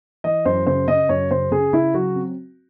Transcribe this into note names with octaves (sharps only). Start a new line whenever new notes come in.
E3 D#5
F#2 C5
C#3 C5
C#3 D#5
F#2 C#5
C#3 C5
C#3 G#4
C#3 E4
F#3 F#4
C4